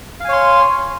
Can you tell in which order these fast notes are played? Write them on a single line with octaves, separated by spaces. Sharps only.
F5 G#5 C#5 C6